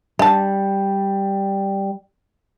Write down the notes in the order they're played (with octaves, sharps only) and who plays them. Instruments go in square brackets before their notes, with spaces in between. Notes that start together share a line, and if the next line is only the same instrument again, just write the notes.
[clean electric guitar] G3 [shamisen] D4 A5